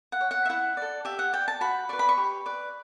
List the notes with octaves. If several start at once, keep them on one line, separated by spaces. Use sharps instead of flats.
F#5
C#5
F#5
E5
E4 F#5
A4 D5
G4 E5
F#5
D5 G5
A5
F#4 B5
B4 D5 C#6
B5
C#6
G4
B4 D5